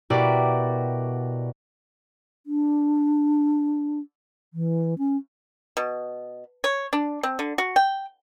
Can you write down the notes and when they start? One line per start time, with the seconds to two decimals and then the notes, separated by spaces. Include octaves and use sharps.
0.10 B2 E4 F#4 G4 A#4 D5
2.46 D4
4.54 E3
4.98 C#4
5.77 B2
6.64 C#5
6.93 D4
7.23 C4
7.39 D3
7.58 F#4
7.76 G5